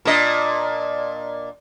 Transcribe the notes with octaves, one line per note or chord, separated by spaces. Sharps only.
A#2 D4 D#5